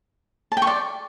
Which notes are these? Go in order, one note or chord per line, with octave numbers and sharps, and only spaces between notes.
A5
G5
C#6
D5